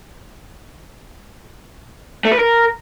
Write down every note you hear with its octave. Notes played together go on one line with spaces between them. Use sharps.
A3
B4
A#4